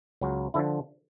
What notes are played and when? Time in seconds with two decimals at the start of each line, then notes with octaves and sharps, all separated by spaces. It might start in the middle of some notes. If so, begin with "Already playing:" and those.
0.21 C#2 C#3 F#3
0.54 D3 F3 E4